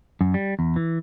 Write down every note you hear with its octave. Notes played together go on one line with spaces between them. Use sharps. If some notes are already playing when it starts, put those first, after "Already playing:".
F#2
G3
E2
E3